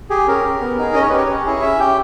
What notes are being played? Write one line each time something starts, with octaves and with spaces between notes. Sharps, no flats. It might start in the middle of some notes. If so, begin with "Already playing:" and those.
G4 G#4
C#4 A#4
G4
B3
D#4 G#4
C#4 D#5
C#5
G4 B4
C#5
C#4
E4 G#4
C#4 E5
G4 G5